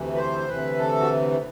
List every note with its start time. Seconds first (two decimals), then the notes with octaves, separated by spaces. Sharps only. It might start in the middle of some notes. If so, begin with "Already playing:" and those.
Already playing: D2 C3 E3
0.14 B4
0.18 C5
0.48 D2 C3 E3 B4
0.79 A4
1.00 F#4